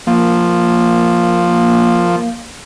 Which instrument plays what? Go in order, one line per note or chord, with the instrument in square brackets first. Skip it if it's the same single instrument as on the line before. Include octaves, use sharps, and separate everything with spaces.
[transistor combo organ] F3 [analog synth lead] A#3